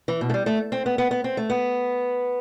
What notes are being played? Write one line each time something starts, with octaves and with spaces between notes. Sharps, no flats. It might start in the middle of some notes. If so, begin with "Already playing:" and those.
E3
B2
A3
G3
A3
C4
B3
B3
B3
C4
A3
B3